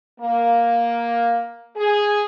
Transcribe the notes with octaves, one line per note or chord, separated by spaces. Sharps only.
A#3
G#4